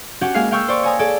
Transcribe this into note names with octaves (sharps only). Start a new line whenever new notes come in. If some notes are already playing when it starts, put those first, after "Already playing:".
C#4 F#4 G4 F#5
G#3 A#3 G#4 F5 C7
F5 G5 C#6 E6 G6
C5 D5 C#6
C#5 G#5 A#5 D#6
G#4 A4 D5